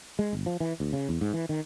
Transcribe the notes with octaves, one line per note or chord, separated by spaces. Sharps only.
G#3
G1
F3
E3
D2
C#3
E2
G#2
E3
D#3